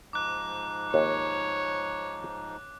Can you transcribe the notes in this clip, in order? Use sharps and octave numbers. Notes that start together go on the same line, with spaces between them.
G#2 F3 D#4 D6 F#6
D#2 C#5